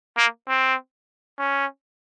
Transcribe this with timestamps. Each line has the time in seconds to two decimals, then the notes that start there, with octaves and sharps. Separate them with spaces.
0.17 A#3
0.48 C4
1.38 C#4